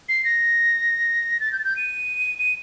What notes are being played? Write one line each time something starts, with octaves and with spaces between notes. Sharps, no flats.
C7
A#6
A6
G6
A6
G6
D#7
D#7